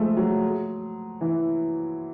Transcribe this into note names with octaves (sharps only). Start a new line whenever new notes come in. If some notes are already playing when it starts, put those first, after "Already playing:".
Already playing: F3 G#3 A3
F#3
E3